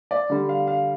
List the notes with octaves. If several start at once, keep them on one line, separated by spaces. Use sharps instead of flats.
D5
D3 G3
F5
F5